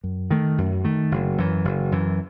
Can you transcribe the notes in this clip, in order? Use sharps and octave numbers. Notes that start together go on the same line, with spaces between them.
F#2
D#3 A3
F#2
D#3 A3
F#1
F#2 E3
F#1
F#2 E3